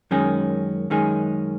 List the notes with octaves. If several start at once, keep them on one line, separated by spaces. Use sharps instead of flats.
F#2 D#3 G#3 C#4 G#4
F#2 D#3 G#3 C#4 G#4